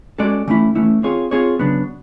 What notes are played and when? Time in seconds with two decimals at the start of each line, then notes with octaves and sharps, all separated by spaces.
0.18 G#3 C#4 F#4 A4 D5
0.48 E3 A3 C#4 E4
0.75 E3 A3 C#4 E4
1.03 C4 F4 G#4 C#5
1.31 C4 F4 G#4 C#5
1.59 C#3 F#3 B3 D4